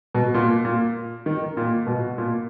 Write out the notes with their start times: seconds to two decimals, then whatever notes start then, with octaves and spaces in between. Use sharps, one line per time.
0.15 B2
0.34 A#2
0.65 A#2
1.26 D#3
1.57 A#2
1.87 B2
2.18 A#2